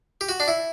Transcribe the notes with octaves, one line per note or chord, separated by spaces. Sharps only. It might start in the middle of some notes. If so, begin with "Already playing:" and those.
G4
F#4
D4
E4